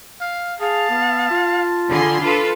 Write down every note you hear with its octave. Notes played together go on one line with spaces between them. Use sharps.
F5
G#4 F5 A5
B3
F4
D3 G#4 B5 C6
D4 F4 A4 B4